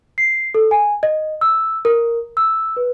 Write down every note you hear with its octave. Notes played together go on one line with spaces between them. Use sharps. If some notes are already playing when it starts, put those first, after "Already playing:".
C7
A4
G#5
D#5
E6
A#4
E6
B4